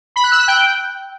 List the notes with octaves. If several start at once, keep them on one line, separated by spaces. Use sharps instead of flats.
B5
F#6
E6
F#6
G5